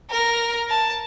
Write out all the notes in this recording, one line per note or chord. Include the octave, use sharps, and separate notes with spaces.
A#4
A5